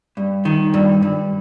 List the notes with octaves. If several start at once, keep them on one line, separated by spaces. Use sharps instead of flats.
G2
D#3
G2
G2